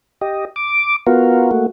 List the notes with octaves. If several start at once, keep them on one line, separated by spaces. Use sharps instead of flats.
G4 D#5
D6
B3 F4 F#4 A#4
A3 A#3 F#4